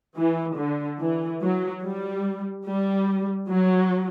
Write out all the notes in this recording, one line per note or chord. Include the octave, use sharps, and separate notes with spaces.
E3
D3
E3
F#3
G3
G3
F#3